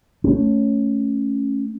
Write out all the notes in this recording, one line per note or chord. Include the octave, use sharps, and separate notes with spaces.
A3 C#4